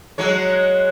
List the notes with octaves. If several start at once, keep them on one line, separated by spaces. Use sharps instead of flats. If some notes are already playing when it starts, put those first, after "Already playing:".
F#3 G#3 C#5